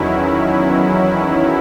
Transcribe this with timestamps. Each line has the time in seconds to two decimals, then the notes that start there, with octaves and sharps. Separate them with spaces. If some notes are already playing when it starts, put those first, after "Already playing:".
Already playing: E2 D#3 F#3 C#4 E4